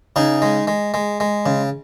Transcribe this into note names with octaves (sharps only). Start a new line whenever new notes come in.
C#3 D#4 G#4
G#3
G#3
G#3
G#3
C#3